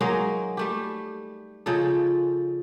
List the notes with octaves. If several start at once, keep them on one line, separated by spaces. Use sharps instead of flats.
F#3 G#3 A#3 D#4
G3 A3 G4
C#3 F3 D#4 A4